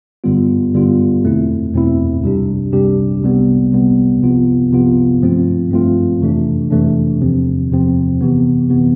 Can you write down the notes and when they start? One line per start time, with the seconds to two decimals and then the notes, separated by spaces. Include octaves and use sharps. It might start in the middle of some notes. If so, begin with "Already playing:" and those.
0.24 G2 D3 G3 B3 F4
0.74 G2 D3 G3 B3 F4
1.23 E2 B2 A3 C4 E4
1.73 E2 B2 A3 C4 E4
2.23 C2 C3 G3 D4 G4
2.72 C2 C3 G3 D4 G4
3.22 C2 C3 G3 B3
3.72 C2 C3 G3 B3
4.23 C2 C3 F3 B3 F4
4.72 C2 C3 F3 B3 F4
5.22 G2 F3 A3 C4 F4
5.72 G2 F3 A3 C4 F4
6.21 F2 C3 E3 A3 D4
6.71 F2 C3 E3 A3 D4
7.21 E2 C3 F3 C4
7.70 E2 C3 F3 C4
8.21 C3 E3 B3
8.70 C3 E3 B3